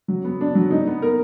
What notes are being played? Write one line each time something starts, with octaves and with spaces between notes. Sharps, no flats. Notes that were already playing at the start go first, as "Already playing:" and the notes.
F#3
B3
D4
F#3
D#4
B3
A#4